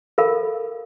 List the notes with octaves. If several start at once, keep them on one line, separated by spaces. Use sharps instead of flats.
A4 A#4 F5 B5